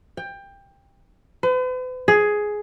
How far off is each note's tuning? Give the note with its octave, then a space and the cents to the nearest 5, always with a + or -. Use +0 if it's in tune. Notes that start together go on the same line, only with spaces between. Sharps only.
G5 +20
B4 +45
G#4 +10